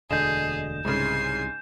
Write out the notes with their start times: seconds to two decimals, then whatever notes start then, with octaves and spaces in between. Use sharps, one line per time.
0.11 E1 D2 D3 G#4 D#5 G6 E7
0.85 C2 G#2 C#3 G#5 C7